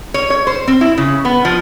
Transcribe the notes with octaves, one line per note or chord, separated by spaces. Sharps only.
C#5
C#5
C5
C4
E4
C#3
B3
F3